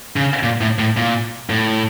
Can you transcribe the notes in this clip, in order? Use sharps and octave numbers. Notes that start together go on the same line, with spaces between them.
C#3
A#2
A2
A2
A#2
A2